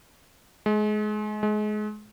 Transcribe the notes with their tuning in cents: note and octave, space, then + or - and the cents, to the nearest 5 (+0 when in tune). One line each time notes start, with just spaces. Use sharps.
G#3 +30
G#3 +30